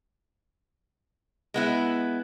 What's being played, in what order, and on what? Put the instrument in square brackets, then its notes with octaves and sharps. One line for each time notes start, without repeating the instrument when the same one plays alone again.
[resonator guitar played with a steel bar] G#3 B3 E4